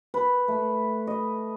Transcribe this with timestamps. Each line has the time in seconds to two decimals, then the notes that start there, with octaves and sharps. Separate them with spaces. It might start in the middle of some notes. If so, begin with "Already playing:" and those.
0.14 B4
0.48 A3
1.07 D#5